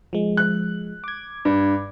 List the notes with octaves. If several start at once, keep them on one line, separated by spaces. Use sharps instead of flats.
F3 G#3
F#6
D6 G#6
G2